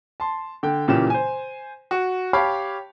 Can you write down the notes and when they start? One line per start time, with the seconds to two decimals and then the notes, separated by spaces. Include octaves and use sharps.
0.20 A5 C6
0.63 D3 G5
0.88 A#2 C#3 E3 G4 E7
1.10 C5 G#5
1.91 F#4
2.33 G4 C#5 F5 A5 B5 D6